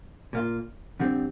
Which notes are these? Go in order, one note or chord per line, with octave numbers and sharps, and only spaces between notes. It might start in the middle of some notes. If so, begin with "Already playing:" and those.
A#2 A#3 F4
F2 D3 G3 C4